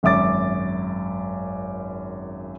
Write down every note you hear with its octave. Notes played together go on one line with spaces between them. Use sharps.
G#1 F#2 E5 D6 A6